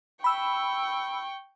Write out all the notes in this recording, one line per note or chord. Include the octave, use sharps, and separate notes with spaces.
G5 B5 C#6 E6